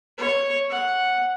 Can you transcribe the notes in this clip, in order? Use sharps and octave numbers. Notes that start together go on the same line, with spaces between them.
C#5
F#5